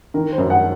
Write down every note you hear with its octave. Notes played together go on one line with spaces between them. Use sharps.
D#3 A#4
C5
F#2
F#5